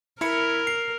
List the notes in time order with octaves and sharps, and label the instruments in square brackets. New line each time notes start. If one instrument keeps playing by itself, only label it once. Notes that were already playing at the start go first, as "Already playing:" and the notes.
[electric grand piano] E4 B5 C#7 [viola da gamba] A#4
[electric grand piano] C7